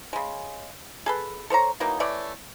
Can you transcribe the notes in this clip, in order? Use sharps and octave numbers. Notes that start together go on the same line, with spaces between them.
C#3 G#3
G#4 A4 B4
A4 C5 C#5 A#5
E3 F#3 A#3 D#4
E3 A3 C#5 D5